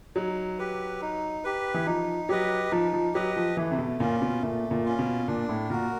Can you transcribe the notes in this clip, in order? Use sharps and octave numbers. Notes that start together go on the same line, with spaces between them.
F#3 D#4
G4 B4
D#4
G4 B4
E3
F3 D#4
F#3 G4 B4 D#5
F3 D#4
F3
F#3 G4 B4 D#5
F3
E3 A3
C3
B2
A#2 C#4 F4
B2
A#2 A3
A#2
C#4 F4
B2
A#2 D4
A2
A#2 F#4 A#4